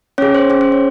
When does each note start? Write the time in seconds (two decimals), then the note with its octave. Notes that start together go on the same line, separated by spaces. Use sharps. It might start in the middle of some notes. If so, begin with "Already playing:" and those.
0.18 C#4 G#4 C#5
0.34 C5
0.50 C#4 G#4 C5
0.61 C5
0.72 C#5